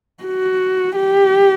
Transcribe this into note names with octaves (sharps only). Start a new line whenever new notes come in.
F#4
G4